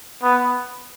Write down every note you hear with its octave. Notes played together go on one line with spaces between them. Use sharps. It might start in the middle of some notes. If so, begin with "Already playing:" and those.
B3